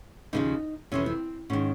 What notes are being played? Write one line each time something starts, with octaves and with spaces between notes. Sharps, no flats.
D#2 C#3 F3 D#4
F2 C3 E3 C#4
C4
G#2 D#3 C#4